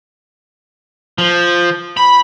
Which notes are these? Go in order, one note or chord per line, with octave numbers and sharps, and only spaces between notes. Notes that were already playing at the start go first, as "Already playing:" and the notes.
F3
B5